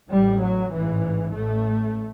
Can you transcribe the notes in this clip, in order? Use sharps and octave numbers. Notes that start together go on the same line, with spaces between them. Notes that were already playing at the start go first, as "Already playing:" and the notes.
A1 A2 G3
F#3
A1 G#2 E3
A1 A2 A3